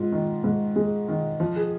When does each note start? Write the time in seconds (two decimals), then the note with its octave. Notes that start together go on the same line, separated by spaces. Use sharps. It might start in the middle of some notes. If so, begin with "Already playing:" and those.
Already playing: G#2 F4
0.12 D#3
0.44 G#2
0.76 G#3
1.08 D#3
1.40 F3
1.56 G#4